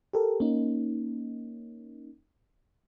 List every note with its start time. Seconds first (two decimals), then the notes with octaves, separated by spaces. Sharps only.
0.13 G4 A4 A#4
0.40 A#3 C#4 D#4